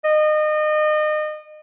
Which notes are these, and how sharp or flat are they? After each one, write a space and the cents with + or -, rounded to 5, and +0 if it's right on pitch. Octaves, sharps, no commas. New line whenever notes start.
D#5 -30